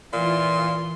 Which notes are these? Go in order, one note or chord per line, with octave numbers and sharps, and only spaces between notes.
A#2 E3 F4 C6